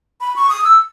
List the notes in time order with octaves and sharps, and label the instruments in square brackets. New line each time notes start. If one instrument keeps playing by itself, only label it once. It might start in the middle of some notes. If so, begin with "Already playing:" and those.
[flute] B5
C#6
D#6
E6